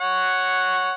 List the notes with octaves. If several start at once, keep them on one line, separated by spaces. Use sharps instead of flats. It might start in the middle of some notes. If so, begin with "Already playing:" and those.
C#5 F#5